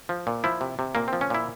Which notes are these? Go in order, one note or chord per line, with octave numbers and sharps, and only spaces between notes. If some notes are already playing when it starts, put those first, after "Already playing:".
F3
A#2
F3 E4
C3
C3
A#2 A#3
F3 C4
C#4
A#2 E4